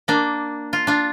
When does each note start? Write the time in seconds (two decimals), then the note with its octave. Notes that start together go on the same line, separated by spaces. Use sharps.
0.08 A#3 D4
0.73 F4
0.87 D4 F4